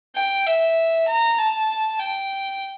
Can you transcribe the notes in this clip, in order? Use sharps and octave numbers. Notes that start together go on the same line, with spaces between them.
G5
E5
A#5
A5
G5